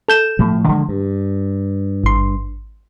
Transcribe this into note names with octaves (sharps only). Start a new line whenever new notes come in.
A4 G6 E7
A2 F3
D3 F3 G#3
G2
G#1 C6